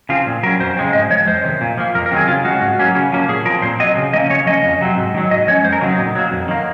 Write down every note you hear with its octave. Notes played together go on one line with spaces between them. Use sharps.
C#3 F3 C4 F4
A#2
F#3 C#4 A#4
F2 C5
C#3 G#3 C4
G#2 D#5
F3 G#3 C#5
F2 C5
C3 D#3
A#2
F3 A#3
F2 A#4
A#4
D#3 F#3 C4 G#4
C#3 F4
G#3 C#4 F#4
G#2
F#3 A#3 C#4
C#3
F3 A#3 C#4
A#2 G#4
F3 C4 A#4
A#2 C5
F#3 C4 D#5
C#3
F3 A#3 C#4 D#5
C#3 C#5
F3 A#3 C#4 D#5
F2
C3 F#3 C4
G#2
D#3 F#3
G#2 D#5
F3 G#3 C#4 C#5
F2 C5
A#4
C#3 F#3 C4 C#4
D#4
A#2
F#3 A#3
F2
D#3 A#3